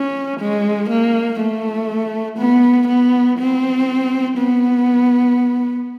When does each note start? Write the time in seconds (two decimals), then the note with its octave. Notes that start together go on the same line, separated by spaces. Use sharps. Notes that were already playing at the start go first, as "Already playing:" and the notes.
Already playing: C#4
0.40 G#3
0.89 A#3
1.39 A3
2.38 B3
2.88 B3
3.38 C4
4.38 B3